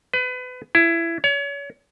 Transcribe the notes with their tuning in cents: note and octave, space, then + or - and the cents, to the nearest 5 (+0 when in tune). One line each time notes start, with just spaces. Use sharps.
B4 +30
E4 +20
C#5 +35